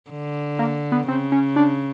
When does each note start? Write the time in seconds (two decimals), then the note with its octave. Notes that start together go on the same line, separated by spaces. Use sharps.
0.11 D3
0.59 A#3
0.92 B3
1.08 C#3 C4
1.32 C#4
1.56 D4